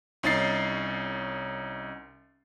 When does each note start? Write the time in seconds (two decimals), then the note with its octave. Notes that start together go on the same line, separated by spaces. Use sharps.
0.23 C2 C#4 D#4 A6 C7